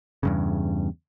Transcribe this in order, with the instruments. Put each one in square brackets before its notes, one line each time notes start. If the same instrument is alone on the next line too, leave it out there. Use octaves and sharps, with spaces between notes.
[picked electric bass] E2 G2 C#3